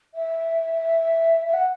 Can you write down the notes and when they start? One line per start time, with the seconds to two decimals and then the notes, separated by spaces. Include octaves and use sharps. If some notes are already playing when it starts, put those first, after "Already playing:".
0.15 E5
1.46 E5
1.54 F#5